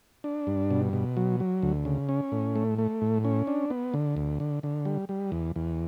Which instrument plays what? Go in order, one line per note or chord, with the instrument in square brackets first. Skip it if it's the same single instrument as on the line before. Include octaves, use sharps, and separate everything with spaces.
[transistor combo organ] D4
G2
B2
B2
F#3
F#3
D2
C#3
C#4
A2
A3
A3
A2
C#4
D4
B3
D3
D2
D3
D3
G3
G3
E2
E2